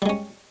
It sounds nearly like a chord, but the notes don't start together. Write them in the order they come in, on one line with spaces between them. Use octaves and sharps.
G3 G#3 C#4